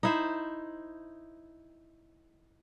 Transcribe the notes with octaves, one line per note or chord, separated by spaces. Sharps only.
D#4 E4 C5